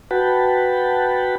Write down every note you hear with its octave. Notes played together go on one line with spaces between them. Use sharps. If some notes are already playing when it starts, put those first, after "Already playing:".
F#4 B4 F#5 G5 A5 B5